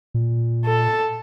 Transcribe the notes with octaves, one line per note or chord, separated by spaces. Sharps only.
A#2
A4